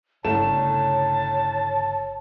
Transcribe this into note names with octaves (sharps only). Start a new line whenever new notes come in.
G1 C2 C#3 A3 C#5 A5 E7